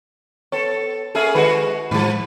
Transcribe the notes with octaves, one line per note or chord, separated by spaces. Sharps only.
B3 A4 C#5
A#3 C#4 G#4 A4 E5
D#3 G#3 F#4 B4 F#5
A2 D#3 F3 G#3